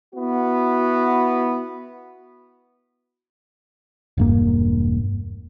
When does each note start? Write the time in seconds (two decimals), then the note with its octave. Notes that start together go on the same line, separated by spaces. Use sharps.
0.15 B3 E4 F#4
4.18 E1 G2 A#3